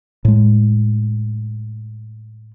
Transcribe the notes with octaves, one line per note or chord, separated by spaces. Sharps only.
A2 G#3